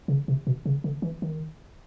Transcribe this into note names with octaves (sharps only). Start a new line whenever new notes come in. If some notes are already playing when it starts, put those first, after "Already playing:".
C#3
C3
B2
C#3
D3
E3
D#3